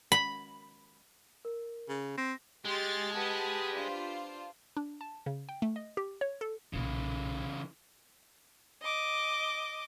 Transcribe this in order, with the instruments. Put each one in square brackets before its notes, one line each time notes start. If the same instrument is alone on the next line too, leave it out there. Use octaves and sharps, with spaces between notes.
[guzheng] B5
[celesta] A#4
[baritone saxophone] C#3
[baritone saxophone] C4 [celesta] A#6
[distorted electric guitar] G#3 [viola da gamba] G4 [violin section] C6 F6 A6
[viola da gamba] G4 B4 [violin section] F#5 A5 D#6
[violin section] D4 F4 C5
[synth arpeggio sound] D4
A5
C#3
G5
A3
D#5
G4
C#5
A4
[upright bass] B1 A#2 [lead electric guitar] C#3 E3
[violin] D#5 D6